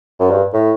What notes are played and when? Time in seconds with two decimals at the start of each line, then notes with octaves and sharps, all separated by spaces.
0.19 F#2
0.30 G2
0.54 A2